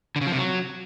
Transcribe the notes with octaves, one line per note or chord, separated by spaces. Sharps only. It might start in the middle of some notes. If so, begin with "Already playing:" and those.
D3
C#3
F3
C3
F#3